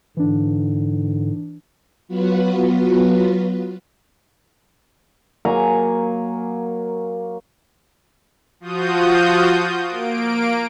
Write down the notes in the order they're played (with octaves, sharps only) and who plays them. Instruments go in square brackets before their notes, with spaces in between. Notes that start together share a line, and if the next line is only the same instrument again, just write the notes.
[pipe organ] G#2 D3 [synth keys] E3 D4
[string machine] F#3 B3 F4 F#4 B4
[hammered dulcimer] F#3 A#3 G#5 A#5
[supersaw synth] F3 F4 F#4 D#6 G6
A#3 D7